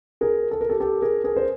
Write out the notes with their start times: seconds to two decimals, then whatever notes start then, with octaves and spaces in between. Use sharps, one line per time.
0.21 G#4 A#4
0.51 A4
0.61 A#4
0.69 G4 A4
0.80 G4 A4
1.02 G#4 A#4
1.24 G#4 A#4
1.37 C5